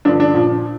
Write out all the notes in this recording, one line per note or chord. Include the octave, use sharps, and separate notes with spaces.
G2 D3 F3 D4
D4
A#2 F3